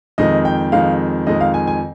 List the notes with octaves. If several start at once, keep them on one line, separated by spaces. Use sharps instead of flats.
F2 D#3 G#3 D#5
G5
F2 D#3 G#3 F5
F2 D#3 G#3 D#5
F5
G#5
G#5